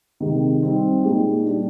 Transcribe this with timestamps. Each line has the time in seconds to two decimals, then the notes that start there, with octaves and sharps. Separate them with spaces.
0.20 C3 D#3 G#3
0.61 G3 C4 D#4
1.03 A#2 G#3 D#4 G4
1.45 G3 D4 G4